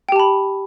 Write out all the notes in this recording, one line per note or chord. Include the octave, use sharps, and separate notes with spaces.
G4 G5 A5 B5